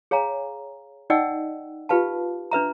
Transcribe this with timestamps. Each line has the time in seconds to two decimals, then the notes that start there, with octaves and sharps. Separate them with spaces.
0.11 G#4 C#5 F5 G#5 A#5
1.10 D#4 D5 D#5 F#5 G5 E6
1.89 F4 G4 B4 F5 A5
2.51 D4 B4 E5 A#5